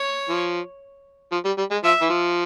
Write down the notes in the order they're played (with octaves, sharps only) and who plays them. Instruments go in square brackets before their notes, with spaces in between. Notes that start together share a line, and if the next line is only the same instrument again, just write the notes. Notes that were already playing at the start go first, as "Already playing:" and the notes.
Already playing: [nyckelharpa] C#5
[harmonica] F3
F3
G3
G3
G#3
[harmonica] F3 [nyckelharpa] E5
[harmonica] E3
F3